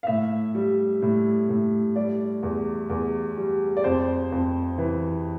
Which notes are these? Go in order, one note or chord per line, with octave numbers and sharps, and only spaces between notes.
F5
A2 E5
G3
A2
A2
G3 D5
E2
E2
G3
D5
F2 C5
F2
E3